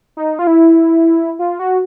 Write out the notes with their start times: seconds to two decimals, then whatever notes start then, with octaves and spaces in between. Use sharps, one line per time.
0.17 D#4
0.39 F4
0.47 E4
1.39 F4
1.59 F#4